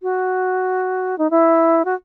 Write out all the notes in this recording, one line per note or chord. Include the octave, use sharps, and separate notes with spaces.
F#4
D#4
E4
F#4